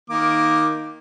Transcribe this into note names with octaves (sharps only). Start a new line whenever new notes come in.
D#3 A#3 D6